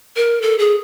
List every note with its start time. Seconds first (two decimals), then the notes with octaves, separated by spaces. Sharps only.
0.17 A#4
0.42 A4
0.59 G#4